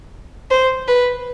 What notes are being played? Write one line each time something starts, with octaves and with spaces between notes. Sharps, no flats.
C5
B4